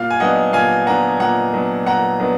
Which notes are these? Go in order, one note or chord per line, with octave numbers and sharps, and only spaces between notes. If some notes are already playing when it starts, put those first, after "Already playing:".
Already playing: A#2 F5
G#5
F#3 B3 D4 D#5 F#5
A#2 F5 G#5
F#3 B3 D4 F#5 A#5
A#2 F#5 A#5
F#3 B3 D4
A#2 F#5 A#5
F#3 B3 D4